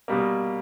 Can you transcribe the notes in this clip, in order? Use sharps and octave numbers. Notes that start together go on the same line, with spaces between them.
B2 G3 A#3